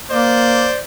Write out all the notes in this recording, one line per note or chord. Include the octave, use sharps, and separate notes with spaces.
A#3 C5 D5